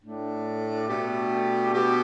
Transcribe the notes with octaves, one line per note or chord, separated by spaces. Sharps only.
A2 A3 D4
B2 A3 D4 G4
B2 B3 G4